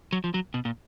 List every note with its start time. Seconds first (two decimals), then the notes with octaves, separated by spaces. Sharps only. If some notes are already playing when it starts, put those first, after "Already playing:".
0.13 F#3
0.24 F3
0.34 F#3
0.54 B2
0.65 A#2